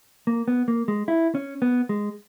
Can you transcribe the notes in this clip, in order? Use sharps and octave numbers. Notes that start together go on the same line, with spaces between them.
A#3
B3
A#3
G#3
E4
C#4
B3
G#3